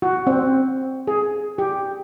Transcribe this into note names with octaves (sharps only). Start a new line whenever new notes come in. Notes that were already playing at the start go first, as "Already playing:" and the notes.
F#4
C4
G#4
G4